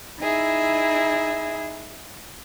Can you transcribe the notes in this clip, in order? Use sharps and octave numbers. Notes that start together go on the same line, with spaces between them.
D#4 E4 G#4 E5